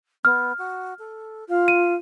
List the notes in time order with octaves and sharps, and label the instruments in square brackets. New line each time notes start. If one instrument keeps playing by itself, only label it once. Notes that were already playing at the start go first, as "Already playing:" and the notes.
[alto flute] B3 [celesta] F6
[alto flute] F#4
A4
[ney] F4 [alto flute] F5
[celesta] D#7